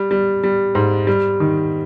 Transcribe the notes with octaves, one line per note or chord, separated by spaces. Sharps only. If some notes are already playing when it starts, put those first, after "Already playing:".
Already playing: G3
G3
G3
G#2
G3
D#3